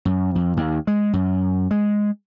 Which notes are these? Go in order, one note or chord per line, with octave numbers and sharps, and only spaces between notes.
F#2
F2
D#2
G#3
F#2
G#3